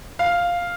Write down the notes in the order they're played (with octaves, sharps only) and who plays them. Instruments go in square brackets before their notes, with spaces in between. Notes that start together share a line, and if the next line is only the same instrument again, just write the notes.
[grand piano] F5